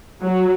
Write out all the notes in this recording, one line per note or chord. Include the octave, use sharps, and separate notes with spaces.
F#3